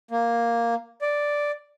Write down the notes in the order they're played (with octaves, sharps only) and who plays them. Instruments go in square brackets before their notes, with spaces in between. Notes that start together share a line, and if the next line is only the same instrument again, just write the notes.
[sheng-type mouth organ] A#3
D5